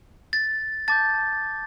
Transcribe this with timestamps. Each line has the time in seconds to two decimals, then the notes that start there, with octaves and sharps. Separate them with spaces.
0.33 A6
0.88 A5 D6 G6 A6